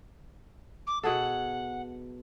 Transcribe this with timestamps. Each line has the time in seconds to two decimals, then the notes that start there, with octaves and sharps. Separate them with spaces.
0.87 D6
1.03 B2 G#4 A4 F#5